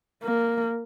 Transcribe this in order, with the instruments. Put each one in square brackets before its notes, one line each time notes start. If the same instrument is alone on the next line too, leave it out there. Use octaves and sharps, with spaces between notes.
[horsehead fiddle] A#3